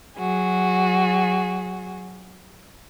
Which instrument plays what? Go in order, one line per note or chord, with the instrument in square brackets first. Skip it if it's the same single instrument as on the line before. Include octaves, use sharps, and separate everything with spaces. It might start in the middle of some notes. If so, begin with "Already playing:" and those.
[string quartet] F#3 F#4 G#4